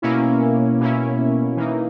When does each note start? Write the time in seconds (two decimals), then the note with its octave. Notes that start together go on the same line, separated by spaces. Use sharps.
0.02 B2 A#3 C#4 E4
0.80 B2 A#3 C#4 E4
1.56 E3 A#3 D#4